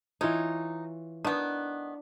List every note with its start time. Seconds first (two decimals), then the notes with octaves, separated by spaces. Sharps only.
0.21 E3 D#4 F4 C#5
1.25 D#3 B3 D4